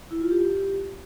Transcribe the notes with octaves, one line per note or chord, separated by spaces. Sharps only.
E4
F4
G4